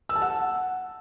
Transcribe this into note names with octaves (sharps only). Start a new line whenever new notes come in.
E6
A5
F#5